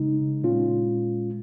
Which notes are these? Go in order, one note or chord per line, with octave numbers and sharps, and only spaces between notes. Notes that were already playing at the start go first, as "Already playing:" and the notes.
Already playing: C#3 G#3 D#4
A#2 G#3 C#4 F4